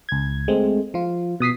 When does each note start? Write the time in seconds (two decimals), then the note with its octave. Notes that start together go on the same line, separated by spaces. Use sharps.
0.09 C#2 G#6
0.48 G#3 A3 C4
0.94 F3 F4
1.40 B2 D#6 B6 C7